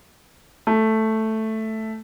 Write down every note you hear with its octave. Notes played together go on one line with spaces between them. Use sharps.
A3